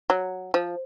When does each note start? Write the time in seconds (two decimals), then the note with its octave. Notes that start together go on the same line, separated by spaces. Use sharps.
0.10 F#3
0.54 F3